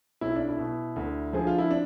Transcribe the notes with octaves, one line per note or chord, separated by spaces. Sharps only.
B1 E4
D4
E4
B2
D2
D3 F3 G#4
F4
E4
D4